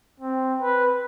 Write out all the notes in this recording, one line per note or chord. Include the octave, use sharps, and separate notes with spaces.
C4
B4